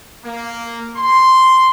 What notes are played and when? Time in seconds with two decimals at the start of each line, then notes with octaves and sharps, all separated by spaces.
0.25 A#3
0.96 C6